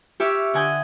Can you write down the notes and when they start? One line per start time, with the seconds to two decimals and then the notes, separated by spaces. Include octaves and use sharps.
0.20 G4 C#5 E5 D6 F6
0.54 D3 F#5 G#5 D#6 G6